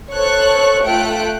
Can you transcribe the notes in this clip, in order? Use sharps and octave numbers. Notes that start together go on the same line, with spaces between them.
A4 C5 C#5 C#6 F#6
A3 F4 G5 F#6 D7